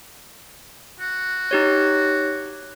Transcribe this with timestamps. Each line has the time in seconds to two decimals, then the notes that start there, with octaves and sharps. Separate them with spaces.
1.00 F#4
1.51 D#4 G4 C#5